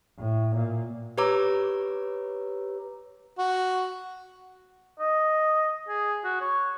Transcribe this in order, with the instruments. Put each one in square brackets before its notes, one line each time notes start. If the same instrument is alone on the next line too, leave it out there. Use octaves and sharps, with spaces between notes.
[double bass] A2
A#2
[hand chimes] G4 B4 C#5 A#5 D6 E6
[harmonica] F#4
[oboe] D#5
G#4
F#4
C#5